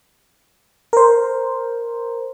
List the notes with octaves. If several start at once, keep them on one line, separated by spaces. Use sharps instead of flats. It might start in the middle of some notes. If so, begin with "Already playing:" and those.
A#4 C5